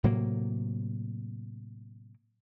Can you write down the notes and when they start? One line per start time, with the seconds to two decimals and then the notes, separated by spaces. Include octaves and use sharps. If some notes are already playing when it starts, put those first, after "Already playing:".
0.04 A2 C3 F#3 A#3